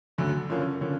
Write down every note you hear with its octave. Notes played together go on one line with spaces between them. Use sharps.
D2 D3 F#3
F#2 D3 F3 A#3 C#4
D3 F3 A#3 C#4